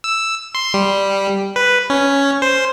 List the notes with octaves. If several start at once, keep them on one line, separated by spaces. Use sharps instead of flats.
E6
C6
G3
B4
C#4
C5